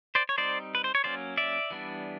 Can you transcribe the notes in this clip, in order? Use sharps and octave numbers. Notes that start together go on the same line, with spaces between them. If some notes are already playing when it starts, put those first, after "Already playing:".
C5 D5
C#5
G3 C4 D#4 C5 D5
B4
C5
C#5
F#3 A#3 C#4 C5 D5
D5 E5
E3 G3 B3 D4